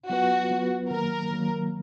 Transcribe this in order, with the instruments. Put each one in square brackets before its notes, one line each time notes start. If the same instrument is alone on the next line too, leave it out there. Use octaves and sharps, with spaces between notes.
[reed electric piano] F#3 B3 F4 B4 [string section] F#4
[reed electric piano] F#3 B3 F4 B4
[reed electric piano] D#3 F#3 A#3 [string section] A#4
[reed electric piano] D#3 F#3 A#3